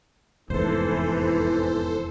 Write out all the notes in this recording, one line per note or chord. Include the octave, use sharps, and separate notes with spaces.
F1 E2 G#2 E3 A4 C5